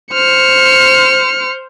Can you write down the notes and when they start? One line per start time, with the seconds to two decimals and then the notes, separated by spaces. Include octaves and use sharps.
0.13 C5 F6 C#7